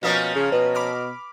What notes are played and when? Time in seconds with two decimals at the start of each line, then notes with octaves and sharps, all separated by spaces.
0.03 B2 F3 A#3 C#4 F5 D#6 G6
0.35 C#3
0.52 B2 B4
0.75 B5 D6 F6